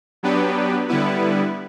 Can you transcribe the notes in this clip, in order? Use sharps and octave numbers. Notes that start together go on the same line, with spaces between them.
F#3 B3 D4 G4 B4
D3 G3 B3 E4 B4